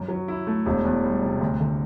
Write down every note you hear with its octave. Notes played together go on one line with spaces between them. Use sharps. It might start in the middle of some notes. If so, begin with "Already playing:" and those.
Already playing: F#2
F#3
E4
A3
E1
E2
G3
C3
D2
D3